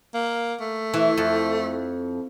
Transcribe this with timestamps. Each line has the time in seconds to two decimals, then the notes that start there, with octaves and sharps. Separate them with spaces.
0.14 A#3
0.60 A3
0.94 E3
1.18 F2